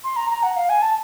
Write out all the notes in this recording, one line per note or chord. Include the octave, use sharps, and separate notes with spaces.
C6
A#5
A#5
F#5
F5
G#5
A5